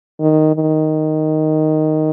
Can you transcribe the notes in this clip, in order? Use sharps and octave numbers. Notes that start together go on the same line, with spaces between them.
D#3
D#3